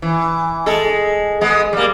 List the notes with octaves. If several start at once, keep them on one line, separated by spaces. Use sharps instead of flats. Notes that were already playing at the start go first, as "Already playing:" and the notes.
E3
G#3 A4
G#3 B3
G3 A#3